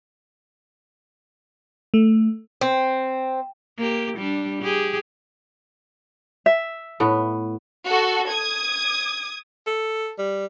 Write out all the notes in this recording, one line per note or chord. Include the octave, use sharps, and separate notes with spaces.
A3
C4
A#3 G4
G3 D4
G4 G#4
E5
A2 B3
F#4 A4
D#6 G#6
A4
G3